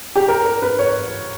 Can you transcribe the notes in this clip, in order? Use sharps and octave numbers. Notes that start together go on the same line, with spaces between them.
G4
A#4
A#4
B4
C#5